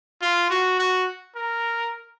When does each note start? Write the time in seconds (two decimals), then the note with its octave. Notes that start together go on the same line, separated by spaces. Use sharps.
0.22 F4
0.50 F#4
0.79 F#4
1.36 A#4